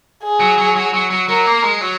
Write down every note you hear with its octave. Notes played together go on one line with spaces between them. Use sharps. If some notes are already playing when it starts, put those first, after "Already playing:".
G#4
F#3
F#3
F#3
F#3
F#3
F#3 A#4
A#3
G#3
F#3